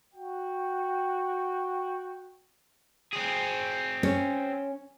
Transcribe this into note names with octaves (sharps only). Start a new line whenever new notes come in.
F#4 G5
C4 G#4
C#4